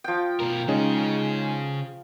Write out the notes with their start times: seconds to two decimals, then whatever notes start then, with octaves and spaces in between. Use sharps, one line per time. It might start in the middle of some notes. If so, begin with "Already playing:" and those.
0.04 F3 G5
0.40 B2 A#4
0.68 C#3 G#3 C#4 D#4 G#4